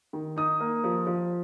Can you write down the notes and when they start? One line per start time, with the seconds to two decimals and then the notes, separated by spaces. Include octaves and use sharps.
0.13 D#3
0.36 D#4 D#6
0.60 A#3
0.84 F3
1.07 F3